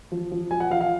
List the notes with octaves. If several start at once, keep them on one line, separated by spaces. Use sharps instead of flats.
F3
F3
F3 G#5
F#5
F3 F5
F5